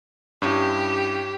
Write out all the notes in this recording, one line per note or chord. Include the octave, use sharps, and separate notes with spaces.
G2 C#4 E4 G4